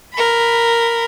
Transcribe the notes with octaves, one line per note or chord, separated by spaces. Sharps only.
A#4 B5